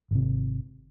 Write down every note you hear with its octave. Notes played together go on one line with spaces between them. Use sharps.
G#1 C3